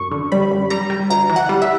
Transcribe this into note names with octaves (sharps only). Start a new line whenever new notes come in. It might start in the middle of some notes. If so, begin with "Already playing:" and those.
Already playing: F#2 C#6
D3
G3 B5
F#2
G3 A#5
G3
D2 A#5
E3
F#5
G3
E5